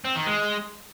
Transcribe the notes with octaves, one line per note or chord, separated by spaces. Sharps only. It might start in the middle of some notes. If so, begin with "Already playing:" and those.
C4
D#3
G#3